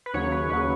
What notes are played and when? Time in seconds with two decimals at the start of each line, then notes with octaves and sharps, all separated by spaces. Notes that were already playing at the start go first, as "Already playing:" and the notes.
0.06 B4
0.14 D#2 C#3 F#3 C#5
0.32 B4
0.50 D#2 C#3 F#3 B4